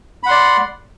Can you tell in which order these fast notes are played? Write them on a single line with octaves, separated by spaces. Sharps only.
B5 F#5 C6 D5